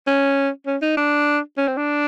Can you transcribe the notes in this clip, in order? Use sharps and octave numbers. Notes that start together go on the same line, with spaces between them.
C#4
C#4
D#4
D4
C#4
C4
D4